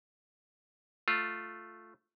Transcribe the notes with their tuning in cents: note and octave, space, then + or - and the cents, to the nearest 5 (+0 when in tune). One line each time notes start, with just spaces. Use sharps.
A3 +0 F4 +0